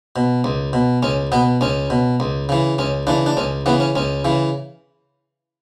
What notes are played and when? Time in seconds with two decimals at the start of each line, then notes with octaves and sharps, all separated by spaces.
0.16 B2
0.44 C#2
0.73 B2
1.03 C#2 C#4
1.32 B2 B3
1.61 C#2 C#4
1.90 B2
2.20 C#2
2.49 C#3 E3
2.78 C#2 C#4
3.07 C#3 E3 D4
3.26 D4
3.37 C#2 C#4
3.66 C#3 E3 B3
3.80 C#4
3.95 C#2 C#4
4.25 C#3 E3